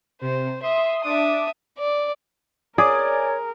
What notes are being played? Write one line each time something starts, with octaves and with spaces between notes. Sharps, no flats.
C3 C5
E5 C6 D#6
D4 E5 D6 D#6
D5
G#4 A#4 C#5 D5 G#5 D6